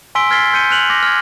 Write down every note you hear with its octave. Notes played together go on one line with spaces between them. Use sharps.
G#5 C6 E6 B6 D7 G7
F6 G#6 A6 B6 C7 G7
C6 G6 C#7 D#7 G7
F6 F#6 F7 F#7
D6 A#6
F6 G#6